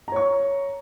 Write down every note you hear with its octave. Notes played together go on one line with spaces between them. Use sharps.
C#5 A#5 C#6